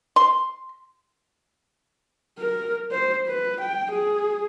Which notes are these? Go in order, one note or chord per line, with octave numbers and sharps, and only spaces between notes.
C6
A#4
C5
B4
G5
G#4